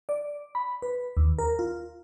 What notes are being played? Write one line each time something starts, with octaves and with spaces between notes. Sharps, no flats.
D5
B5
B4
D#2
A#4
F4